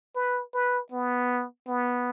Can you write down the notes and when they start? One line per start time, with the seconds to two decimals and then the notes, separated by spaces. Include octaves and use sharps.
0.15 B4
0.53 B4
0.92 B3
1.67 B3